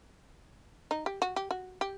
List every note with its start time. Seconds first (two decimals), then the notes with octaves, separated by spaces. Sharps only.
0.91 D#4
1.06 G4
1.22 F#4
1.36 G4
1.51 F#4
1.81 G4